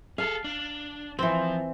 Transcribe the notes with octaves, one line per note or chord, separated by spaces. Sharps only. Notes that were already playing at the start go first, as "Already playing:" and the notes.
G#4 A4 F5
D4
E3 F3 C4